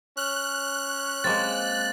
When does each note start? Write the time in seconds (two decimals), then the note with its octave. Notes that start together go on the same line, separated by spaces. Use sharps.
0.17 C#4 F#6
1.24 G#3 A#3 C4 A6